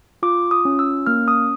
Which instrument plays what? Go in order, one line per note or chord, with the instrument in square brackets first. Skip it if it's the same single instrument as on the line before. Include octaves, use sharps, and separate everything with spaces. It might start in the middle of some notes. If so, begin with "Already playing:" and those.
[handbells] F4 D6
D#6
C#4
E6
A#3 F6
D#6